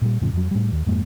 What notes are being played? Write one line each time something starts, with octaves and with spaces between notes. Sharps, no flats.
A#2 G3
F2 A2 C#3 F3
F2 F#3
A2 G3
D#2
F2 G#2 G#3 A#3